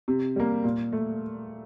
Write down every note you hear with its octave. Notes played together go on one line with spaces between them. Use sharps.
C3
G3 A#3
A#2
A3